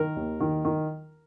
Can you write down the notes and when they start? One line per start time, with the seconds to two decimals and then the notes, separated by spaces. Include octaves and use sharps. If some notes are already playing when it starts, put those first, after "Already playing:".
Already playing: D#3 A#4
0.16 D#2
0.40 D#3
0.65 D#3